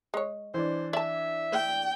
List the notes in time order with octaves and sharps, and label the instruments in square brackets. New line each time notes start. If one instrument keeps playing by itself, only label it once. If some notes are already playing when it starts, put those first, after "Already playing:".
[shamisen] G#3 C#5
[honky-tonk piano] E3 D4 [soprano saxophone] C5
[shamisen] D5 A5 [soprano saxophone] E5
[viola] G5